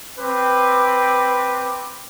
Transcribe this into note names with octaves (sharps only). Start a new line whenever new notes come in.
C4 B4 D6